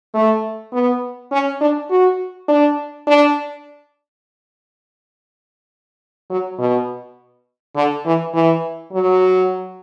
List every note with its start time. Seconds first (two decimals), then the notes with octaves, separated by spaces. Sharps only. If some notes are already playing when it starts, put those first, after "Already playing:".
0.14 A3
0.72 B3
1.32 C#4
1.60 D4
1.90 F#4
2.48 D4
3.07 D4
6.30 F#3
6.59 B2
7.76 D3
8.06 E3
8.34 E3
8.93 F#3